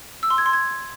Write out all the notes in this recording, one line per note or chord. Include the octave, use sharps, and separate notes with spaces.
E6
C6
G#6
C6
G#6